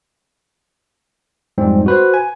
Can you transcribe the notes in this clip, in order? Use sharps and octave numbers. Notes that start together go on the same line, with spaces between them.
F2 G#2 G3 C4
F#4 B4 C5
G#5